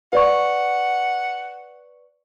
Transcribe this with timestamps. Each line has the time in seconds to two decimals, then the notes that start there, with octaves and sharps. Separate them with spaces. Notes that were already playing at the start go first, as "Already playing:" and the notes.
0.13 B4 D5 F#5 C#6